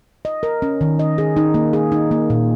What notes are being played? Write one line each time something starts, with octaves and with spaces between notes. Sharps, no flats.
D#5
A#4
C#4
D#3
D#5
G#4
D#4
A#3
G#4
D#4
A#3
A#2